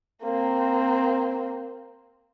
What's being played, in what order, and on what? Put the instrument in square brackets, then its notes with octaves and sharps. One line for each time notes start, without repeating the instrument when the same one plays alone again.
[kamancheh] A#3 C4